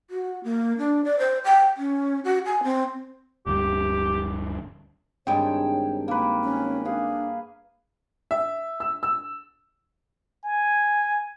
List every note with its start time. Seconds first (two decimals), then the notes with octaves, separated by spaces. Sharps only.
0.10 F#4
0.44 A#3
0.78 D4
1.04 D5
1.19 C5
1.44 G5
1.77 C#4
2.25 F#4
2.46 G#5
2.64 C4
3.46 D1 D2 G2 G4
5.27 G#1 G2 G#3 D#4 C#5 G5 A5
6.08 A#3 B4
6.43 C#4
6.85 D4 G#4 F5
8.31 E5
8.80 E6
9.03 E6
10.44 G#5